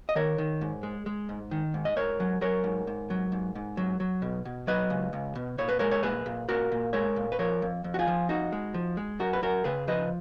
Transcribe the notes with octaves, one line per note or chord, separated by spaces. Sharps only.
D#5
D#3 A#4 C#5
D#3
G#2
G#3
G#3
G#2
D#3
G#2
D#5
G#2 A#4 C#5
F#3
F#3 A#4 C#5
G#2
G#2
F#3
G#2
G#2
F#3
F#3
B2
B2
F#3 B4 D#5
C#2
C#2
B2
A#2 C#5
B4
G#3 A#4 C#5
C#5
A#2 G#4 B4
A#2
A#2 F#4 A#4
A#2
G#3 A#4 C#5
A#2
B4
F3 A#4 C#5
F2
F2
F#4
F4 G#4
F3
F2 D#4 F#4
G#3
F3
G#3
F#2 F#4 A#4
B4
F#2 F#4 A#4
C#3 G#4 B4
F3 B4 D#5